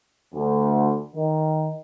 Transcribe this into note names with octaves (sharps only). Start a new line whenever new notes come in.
D2
D#3